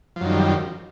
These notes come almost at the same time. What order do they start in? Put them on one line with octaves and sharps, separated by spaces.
F3 F#2 D#3 G3